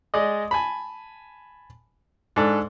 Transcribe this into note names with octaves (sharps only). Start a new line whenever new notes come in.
G#3 D5 D#5
G#5 A5 B5
G#2 D4 A4 D5